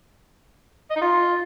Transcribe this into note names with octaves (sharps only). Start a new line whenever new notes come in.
D#5
D#4
F4